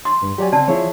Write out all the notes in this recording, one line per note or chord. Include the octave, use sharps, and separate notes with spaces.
C6
G2
F#3 G4 D5 G#5
C#3 C4 D5 A5
F3 E4 G#4 C#5